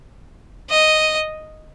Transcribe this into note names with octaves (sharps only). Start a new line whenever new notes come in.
D#5